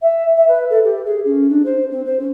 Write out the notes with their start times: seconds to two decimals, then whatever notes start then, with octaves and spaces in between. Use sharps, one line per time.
0.01 E5
0.36 E5
0.47 B4
0.69 A4
0.84 G4
1.05 G#4
1.25 C#4
1.49 D4
1.65 C5
1.91 C4
2.05 C5
2.19 C#4